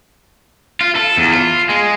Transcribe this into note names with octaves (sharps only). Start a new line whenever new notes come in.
F4
A4
E2
F4
G#3